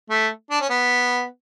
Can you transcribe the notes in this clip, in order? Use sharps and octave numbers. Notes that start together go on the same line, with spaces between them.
A3
D4
C#4
B3